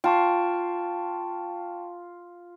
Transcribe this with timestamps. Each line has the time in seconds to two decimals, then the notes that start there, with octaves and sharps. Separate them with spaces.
0.04 F4 G5 A5 C#6